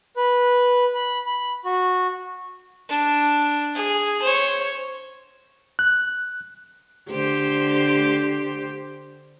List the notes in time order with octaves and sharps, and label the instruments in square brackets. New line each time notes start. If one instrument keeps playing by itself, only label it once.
[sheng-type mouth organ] B4
B5
B5
F#4
[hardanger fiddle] D4
G#4
C5 C#5
[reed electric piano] F#6
[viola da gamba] D3 G4 C5